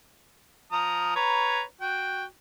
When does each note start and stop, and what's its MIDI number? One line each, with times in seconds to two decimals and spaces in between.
0.72 1.13 53
0.72 1.13 82
0.72 1.13 87
1.16 1.61 71
1.16 1.61 73
1.16 1.61 82
1.81 2.24 66
1.81 2.24 79